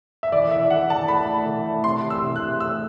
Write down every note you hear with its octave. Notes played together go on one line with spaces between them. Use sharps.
E5
E3 D5
E3 E5
E3 F#5
E3 A5
A3 B5
A3
E3
A3
C3 C6
E3
E6
C3
F#6
A3
A3 E6